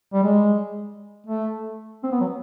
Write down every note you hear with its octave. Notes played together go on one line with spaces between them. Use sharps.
G3
G#3
A3
C4
B3
F#3